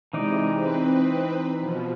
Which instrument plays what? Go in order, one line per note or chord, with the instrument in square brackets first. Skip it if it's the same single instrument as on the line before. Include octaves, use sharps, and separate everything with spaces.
[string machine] C3 G#3 [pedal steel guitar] E3 D#4 D5
[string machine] C4 B4
B2 F3